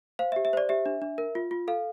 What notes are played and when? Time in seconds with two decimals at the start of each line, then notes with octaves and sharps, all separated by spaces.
0.19 C5 F5
0.32 E5
0.36 G4
0.45 E5
0.53 C5 D5
0.69 G4 E5
0.86 D4
1.02 D4
1.18 A#4
1.35 F4
1.51 F4
1.68 A4 F5